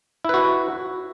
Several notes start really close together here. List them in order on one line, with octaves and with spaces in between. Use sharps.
E4 B4 F#4